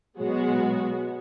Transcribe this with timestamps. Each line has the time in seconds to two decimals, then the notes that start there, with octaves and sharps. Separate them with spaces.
0.19 B2 F#3 G#3 B3 F#4